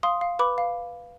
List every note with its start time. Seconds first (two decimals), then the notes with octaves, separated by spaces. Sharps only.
0.03 F5 C6 D#6
0.21 F5
0.39 B4 B5 D6
0.58 F5